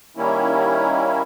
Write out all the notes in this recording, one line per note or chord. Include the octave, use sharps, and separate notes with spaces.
D#3 G3 A#3 C#4 E4